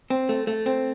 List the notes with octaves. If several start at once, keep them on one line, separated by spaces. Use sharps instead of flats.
C4
A3
A3
C4